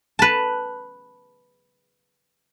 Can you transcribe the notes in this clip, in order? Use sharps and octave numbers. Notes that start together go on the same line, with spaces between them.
B4 A5